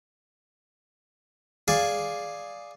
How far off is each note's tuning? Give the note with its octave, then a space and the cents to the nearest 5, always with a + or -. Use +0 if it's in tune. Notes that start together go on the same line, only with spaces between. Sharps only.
G#4 +0 D5 +0 F5 +0